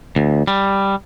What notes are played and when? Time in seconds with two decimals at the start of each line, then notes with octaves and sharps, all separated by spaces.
0.16 D2
0.47 G3